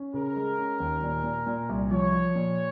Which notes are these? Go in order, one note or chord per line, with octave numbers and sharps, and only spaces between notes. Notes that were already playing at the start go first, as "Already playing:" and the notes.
Already playing: C#4
C#3 A#4
G#3
C#4
D#2
A#2
A#2
A#2
C2
F3 C#5
F3
A#2